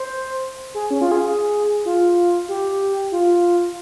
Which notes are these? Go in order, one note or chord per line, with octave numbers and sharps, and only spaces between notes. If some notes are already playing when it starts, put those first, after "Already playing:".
Already playing: C5
G#4
C#4
F4
G#4
F4
G4
F4